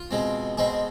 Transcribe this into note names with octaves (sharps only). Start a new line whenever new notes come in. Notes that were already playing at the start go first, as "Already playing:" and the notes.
Already playing: F4
B2 G#3 C4
B2 G#3 C4 G#4